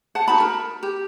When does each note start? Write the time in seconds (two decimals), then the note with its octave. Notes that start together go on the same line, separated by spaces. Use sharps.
0.15 F#5 A5
0.28 D#4 F#4 A5 B5
0.40 A#4
0.83 G4